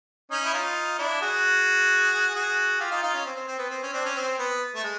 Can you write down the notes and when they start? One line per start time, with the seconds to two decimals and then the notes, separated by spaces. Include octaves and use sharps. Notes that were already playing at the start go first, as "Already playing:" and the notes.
0.31 C#4 D#4
0.44 E4
0.54 D#4 F4
0.99 D4 E4
1.21 F#4 G#4
2.34 F#4 G#4
2.80 F4 G4
2.91 D#4 F4
3.02 D#4 F4
3.14 C#4
3.25 C4
3.36 C4
3.48 C4
3.59 B3
3.70 C4
3.82 C#4
3.93 C4 D4
4.05 C#4
4.16 C4
4.38 B3
4.75 A3
4.84 G#3